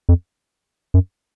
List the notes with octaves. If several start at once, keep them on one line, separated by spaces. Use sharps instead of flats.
F2
F#2